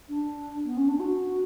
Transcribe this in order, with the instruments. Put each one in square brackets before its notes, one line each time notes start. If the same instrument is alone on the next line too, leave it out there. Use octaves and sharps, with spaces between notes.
[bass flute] D4
B3
C#4
D4
F#4